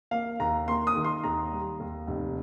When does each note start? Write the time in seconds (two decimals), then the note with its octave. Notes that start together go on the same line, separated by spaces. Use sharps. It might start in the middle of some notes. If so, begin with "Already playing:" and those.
0.11 A#3 F5
0.40 D#2 A#5
0.68 A#3 C6
0.87 D#6
0.96 D#3
1.04 C6
1.24 D#2 A#5
1.52 G3
1.80 D#2
2.07 F1